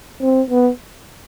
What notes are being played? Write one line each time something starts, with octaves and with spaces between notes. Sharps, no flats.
C4
B3